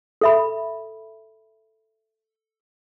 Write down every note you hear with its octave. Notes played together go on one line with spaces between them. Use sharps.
A4 E5 B5